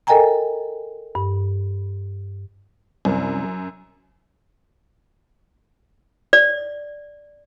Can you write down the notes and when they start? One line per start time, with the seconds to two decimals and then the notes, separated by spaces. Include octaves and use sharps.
0.07 A4 A#4 D#5 G5 G#5 A#5
1.15 G2
3.05 C2 F#2
6.33 D5